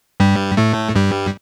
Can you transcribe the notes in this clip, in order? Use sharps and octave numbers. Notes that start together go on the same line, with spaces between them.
G2 G3
A2 A3
G2 G3